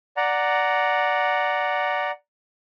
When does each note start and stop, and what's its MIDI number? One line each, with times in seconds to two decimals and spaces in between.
0.17 2.11 74
0.17 2.11 78
0.17 2.11 82